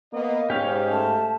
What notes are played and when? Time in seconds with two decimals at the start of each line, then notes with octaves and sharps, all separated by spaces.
0.13 A#3 B3 D#5
0.50 G#2 C#4 G4 F5
0.90 A3 A5